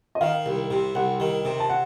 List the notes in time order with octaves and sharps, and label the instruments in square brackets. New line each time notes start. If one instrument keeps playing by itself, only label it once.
[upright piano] D#5
[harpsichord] D#3 [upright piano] F5
[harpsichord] C2
C3
[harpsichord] C2 [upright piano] F#5
[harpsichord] D#3
C3
[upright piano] A5
F#5